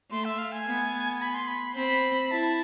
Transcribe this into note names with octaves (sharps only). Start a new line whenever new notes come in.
A3 C6
E5
F5
G#5
B3
B5
C6
B5
C4 B5
E4 A5